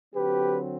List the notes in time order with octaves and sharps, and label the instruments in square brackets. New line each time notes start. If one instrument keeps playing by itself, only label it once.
[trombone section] D3 F#3 C4 G4 B4